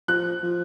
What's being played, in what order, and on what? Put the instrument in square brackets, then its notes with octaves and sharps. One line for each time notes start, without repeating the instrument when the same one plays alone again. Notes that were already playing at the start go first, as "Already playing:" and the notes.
[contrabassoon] F3 [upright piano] F#6
[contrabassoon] F3